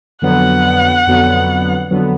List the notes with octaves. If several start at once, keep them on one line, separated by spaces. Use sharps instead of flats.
F2 D3 F#3 B3 F#5
F2 D3 F#3 B3
F2 D3 F#3 B3